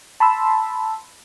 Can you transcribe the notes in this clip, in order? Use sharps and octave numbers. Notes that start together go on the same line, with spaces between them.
A5 B5 C6 E6